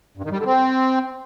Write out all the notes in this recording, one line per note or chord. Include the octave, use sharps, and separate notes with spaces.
G2
D#3
G3
D3
C4